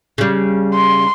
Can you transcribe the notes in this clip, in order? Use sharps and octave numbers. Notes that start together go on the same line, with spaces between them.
C#3 G3
C6